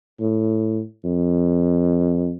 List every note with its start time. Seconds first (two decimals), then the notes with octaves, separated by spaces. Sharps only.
0.20 A2
1.04 F2